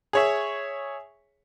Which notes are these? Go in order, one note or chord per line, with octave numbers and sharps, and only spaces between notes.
G#4 C#5 E5